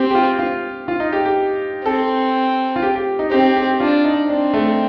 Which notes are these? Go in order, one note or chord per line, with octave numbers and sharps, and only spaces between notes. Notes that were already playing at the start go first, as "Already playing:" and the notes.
Already playing: C4 G4
G4
F4
F4
F4
D#4
G4
G4
C4 A4
F4
G4
G4
D#4
C4 G4
G4
D4 F4
D#4
C4 D4
A3